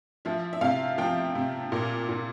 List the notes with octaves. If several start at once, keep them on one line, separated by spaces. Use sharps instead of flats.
F3 E5
E5
C3 F5
F3 G5
C3
A#2
A#2